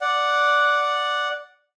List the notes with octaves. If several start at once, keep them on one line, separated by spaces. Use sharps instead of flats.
D5 F#5